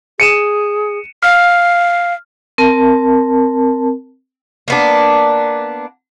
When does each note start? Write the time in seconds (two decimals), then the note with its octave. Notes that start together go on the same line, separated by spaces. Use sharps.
0.20 G#4 C#7 D#7 E7
1.23 F5 F6
2.58 C4 A#4 A5
4.68 A#3 B3 D4